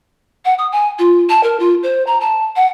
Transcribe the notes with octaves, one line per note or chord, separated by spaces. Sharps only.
F#5
D#6
G#5
F4
A5
A#4
F4
C5
A#5
A5
F#5